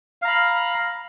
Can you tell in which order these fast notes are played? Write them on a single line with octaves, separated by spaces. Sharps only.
F5 A#5 B5